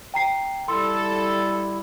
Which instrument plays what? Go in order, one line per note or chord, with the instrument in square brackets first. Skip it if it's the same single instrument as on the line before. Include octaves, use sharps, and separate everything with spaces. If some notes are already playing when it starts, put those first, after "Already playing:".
[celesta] G5 A#5 C7
[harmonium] G3 E4 [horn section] A4 [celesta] C6